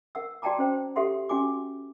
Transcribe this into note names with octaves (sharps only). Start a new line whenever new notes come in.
A#4 F#5 E6
F#4 D5 G5 A5 A#5 D6
C#4 C5 G5
G4 A4 E5 F#5 C6
C#4 F#4 G#5 D6